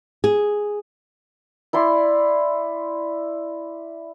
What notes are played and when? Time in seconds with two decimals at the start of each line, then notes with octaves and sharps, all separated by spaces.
0.24 G#4
1.73 E4 D5 C6